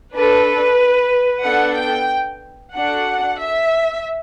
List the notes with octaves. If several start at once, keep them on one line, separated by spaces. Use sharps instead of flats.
D4 A4 B4
B3 D4 A4 F#5
G5
D4 F#4 A4 F#5
E5